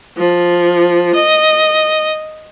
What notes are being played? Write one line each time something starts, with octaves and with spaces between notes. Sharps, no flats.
F3
D#5